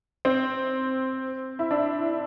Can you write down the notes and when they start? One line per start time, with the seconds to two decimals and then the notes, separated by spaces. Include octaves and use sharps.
0.25 C4
1.59 E4
1.71 D4